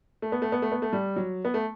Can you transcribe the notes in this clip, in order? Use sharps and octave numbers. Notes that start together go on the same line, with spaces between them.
A3
B3
A3
B3
A3
B3
A3
G3
F#3
B3
A3